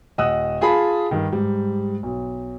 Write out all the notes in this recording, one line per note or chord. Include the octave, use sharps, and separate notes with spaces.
D#1 D#5 F#5 D#6 E6 F#6
F4 G#4 F5 A5 B5
G2 D#3
G#2 G3
B1